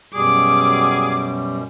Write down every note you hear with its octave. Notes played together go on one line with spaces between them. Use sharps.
F#2 B2 G3 G#4 D6